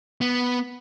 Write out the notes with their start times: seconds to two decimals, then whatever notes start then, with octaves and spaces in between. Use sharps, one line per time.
0.21 B3